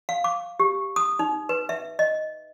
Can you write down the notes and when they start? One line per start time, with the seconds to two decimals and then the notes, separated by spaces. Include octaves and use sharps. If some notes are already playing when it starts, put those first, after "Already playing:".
0.09 F5
0.24 D6
0.60 G4
0.96 D#6
1.19 D#4
1.49 B4
1.69 E5
1.99 D#5